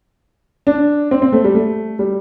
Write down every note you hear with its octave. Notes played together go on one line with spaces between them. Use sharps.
D4
C4
C4
A3
G3
A3
G3